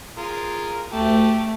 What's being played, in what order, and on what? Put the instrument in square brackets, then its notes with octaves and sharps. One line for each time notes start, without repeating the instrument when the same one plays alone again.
[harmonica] F4 G#4 A#4
[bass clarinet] D2 [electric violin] A3 [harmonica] G4 A5